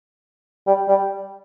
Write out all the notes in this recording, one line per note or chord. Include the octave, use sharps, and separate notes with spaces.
G3
G3